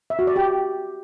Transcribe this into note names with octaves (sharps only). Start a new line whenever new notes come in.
E5
F#4
D5
G4